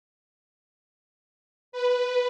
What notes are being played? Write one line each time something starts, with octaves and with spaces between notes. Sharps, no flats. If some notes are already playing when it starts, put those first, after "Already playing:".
B4